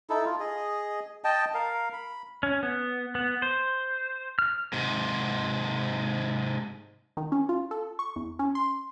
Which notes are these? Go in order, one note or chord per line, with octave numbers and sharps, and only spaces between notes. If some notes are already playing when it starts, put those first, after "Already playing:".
D#4 E4 A4
F4
G#4 D#5
D#5 G5 A5
A#4 F5
B5
C#4
B3
B3
C5
F6
G#2 C3
D#3
C#4
F4
A4
C#6
E2
C#4
C6